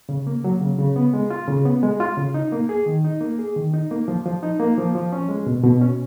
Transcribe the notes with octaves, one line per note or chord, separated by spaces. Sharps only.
C#3
A#3
F#3
C#3
C#3
B3
G#3
F4
C#3
B3
G#3
F4
C#3
D#4
A#3
G#4
D#3
D#4
A#3
G#4
D#3
D#4
A#3
F3
F3
D#4
A#3
F3
F3
C#4
G#3
B2
B2
C#4